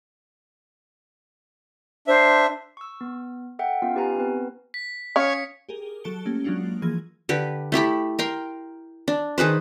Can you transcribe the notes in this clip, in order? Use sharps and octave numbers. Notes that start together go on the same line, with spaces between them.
D4 C5 E5
C#6 E6
B3
A4 E5 F#5 G5
B3 C#4 F4 F5
D#4 G4 B4 G#5 A#5
B3 C4 B4
B6
C#4 C#5 F5 G#5 D#6 C#7
G4 G#4 A#4
F#3 A4 A5 C#7 D7 G7
A3 A#3 C#4 G4
F#3 G#3 A#3 D4 F4 F#4
E3 F3 A#3 G#4 G#6
D3 G4 B4
A3 E4 G4 B5
A#4 G5 C6
D4
D#3 G#4 B4 C5